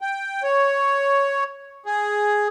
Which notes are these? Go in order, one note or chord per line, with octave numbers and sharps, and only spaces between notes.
G5
C#5
G#4